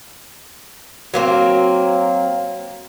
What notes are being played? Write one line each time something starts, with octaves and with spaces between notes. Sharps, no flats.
F#3 A#3 C4